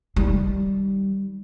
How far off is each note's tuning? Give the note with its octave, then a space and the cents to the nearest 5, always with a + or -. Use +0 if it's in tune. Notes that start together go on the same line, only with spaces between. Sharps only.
D#3 +0 G3 -5